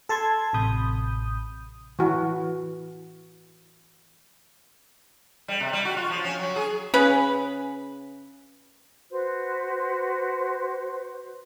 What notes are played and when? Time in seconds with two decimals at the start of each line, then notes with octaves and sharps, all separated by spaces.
0.09 A4 A5 C6 G#6
0.53 A1 C3 B5 D#6 G6
1.99 E3 F#4
5.48 G3
5.60 C3
5.73 G3
5.85 F#4
5.97 F4
6.09 F3
6.24 C#4
6.39 F#3
6.56 G#4
6.94 C#3 C#4 G#4 B4
9.09 F#4 B4 C5